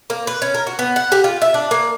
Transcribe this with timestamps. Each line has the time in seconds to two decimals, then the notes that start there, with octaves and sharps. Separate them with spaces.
0.10 A#3
0.27 B4
0.42 C#4
0.54 A#4
0.67 F#4
0.79 B3
0.96 F#5
1.12 G4
1.24 F4
1.42 E5
1.54 D4
1.71 A#3